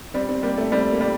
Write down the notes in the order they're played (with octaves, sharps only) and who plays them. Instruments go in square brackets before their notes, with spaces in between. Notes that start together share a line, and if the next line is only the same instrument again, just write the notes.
[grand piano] G3 [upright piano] C4
[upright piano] C4
[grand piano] G3 [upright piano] A#3
[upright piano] A3
[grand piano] G3 [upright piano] C4
[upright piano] A#3
[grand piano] G3